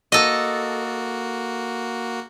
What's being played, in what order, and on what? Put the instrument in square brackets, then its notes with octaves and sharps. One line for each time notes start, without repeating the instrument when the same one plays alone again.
[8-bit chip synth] A#3 F#4 [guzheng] A4 D#5